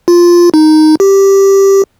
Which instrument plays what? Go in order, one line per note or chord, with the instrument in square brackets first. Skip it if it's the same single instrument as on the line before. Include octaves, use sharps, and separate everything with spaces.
[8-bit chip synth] F4
D#4
G4